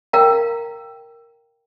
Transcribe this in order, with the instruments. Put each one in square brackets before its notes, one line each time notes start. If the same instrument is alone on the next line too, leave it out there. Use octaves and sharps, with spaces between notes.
[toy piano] A#4 F5 G5 A#5